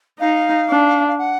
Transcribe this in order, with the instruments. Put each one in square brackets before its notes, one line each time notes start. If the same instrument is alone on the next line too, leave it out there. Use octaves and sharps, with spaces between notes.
[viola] D#4 [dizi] F5
[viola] D4
[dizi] F5
F#5